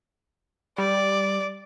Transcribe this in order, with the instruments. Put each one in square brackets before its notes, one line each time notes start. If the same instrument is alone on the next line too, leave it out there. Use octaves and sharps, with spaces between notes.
[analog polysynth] G3 [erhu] D5